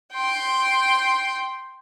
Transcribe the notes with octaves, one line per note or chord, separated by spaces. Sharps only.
G5 C6